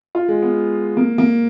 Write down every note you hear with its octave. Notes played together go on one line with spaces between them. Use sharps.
F4
G#3
B3
A#3
A#3